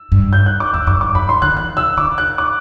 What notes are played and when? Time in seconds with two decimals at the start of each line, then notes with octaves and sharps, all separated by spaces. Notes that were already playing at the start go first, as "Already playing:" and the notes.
Already playing: E6
0.12 G2
0.33 G6
0.46 F#6
0.60 D6
0.74 E2 E6
0.87 F#2 D6
1.01 G2 D6
1.15 F#2 B5
1.29 C6
1.42 D3 F#6
1.57 E3 F#6
1.77 E6
1.97 D3 D6
2.18 F#6
2.38 D6